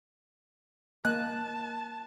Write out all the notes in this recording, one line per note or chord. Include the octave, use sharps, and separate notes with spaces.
A#3 D#5 G#5 A5 F#6